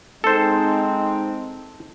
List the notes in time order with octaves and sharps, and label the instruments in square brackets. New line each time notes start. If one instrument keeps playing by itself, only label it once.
[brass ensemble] G#3 C4 D#4 [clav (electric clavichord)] A4 C5